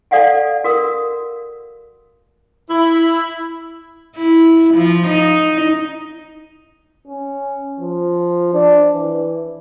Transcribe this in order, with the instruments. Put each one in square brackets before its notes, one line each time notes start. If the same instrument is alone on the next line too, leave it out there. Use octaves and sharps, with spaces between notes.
[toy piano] A4 D5 F5 F#5 G#5
F#4 A#4 D#6
[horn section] E4
[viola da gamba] E4
F3
D#4
[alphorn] C#4
F3
D4
E3